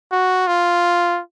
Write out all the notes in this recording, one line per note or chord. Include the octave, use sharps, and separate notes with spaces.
F#4
F4